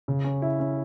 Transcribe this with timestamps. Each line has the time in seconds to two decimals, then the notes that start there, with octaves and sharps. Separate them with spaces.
0.08 C#3
0.24 C#4
0.42 E4
0.60 C#4